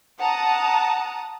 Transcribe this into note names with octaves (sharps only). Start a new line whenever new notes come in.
F#5 A5 A#5 D#6